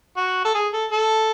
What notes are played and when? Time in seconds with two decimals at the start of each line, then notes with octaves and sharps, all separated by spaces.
0.17 F#4
0.45 A4
0.55 G#4
0.73 A4
0.92 A4